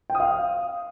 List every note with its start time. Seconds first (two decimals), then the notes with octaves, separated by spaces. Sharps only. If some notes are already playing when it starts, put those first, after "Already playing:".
0.10 G5
0.15 D#6
0.20 F5